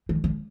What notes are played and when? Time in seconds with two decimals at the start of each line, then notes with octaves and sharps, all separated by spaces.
0.09 D#3
0.24 D3